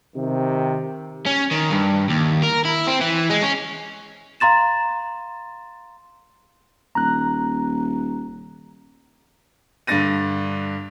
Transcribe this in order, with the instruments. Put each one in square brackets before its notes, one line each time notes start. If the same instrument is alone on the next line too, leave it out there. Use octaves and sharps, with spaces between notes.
[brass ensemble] C3 D#3
[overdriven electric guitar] C#4
D#3
G2
D#2
A#4
E4
C4
E3
G#3
C#4
[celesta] F5 A#5 C6 A6 E7
[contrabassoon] D#1 [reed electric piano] A#5 F#6
[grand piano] G2 D3 D4 A6 A#6 D#7